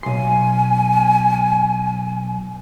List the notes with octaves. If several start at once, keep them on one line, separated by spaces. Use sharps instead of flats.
B1 G#5 C6